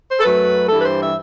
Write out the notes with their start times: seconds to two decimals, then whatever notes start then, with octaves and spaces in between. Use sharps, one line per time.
0.08 C5
0.19 A4
0.23 F#2 F#3 A3 B4
0.68 G2 E3 G3 A4
0.80 B4
0.84 C5
1.02 E5